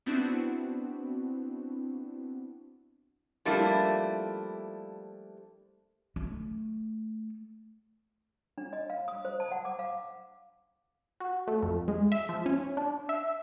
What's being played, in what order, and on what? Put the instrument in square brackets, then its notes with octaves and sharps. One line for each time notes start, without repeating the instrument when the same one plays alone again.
[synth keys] B3 C4 D4 E4 F#4
[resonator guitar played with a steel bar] F3 G3 A3 A#3 D4 E4
[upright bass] A3
[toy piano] D4
D#5
F5
D#6
C5
A5
F#5
D6
F5
[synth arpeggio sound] F#4
A3
F2
G#3
E5
F3
C#4
D4
E5